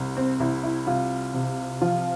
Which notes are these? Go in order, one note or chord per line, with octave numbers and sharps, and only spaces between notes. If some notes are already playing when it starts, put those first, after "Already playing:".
Already playing: C2
C4
C2 E4
E4
C2 F4
C3
F3 F4